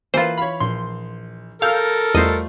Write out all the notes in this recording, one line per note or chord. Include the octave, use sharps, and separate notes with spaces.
E3 A#3 F4 B4 C5
C#5 F5 B5
A#1 C6
A4 A#4 F5 E6 F6 G6
E2 G3 A3 F4 C5 D#5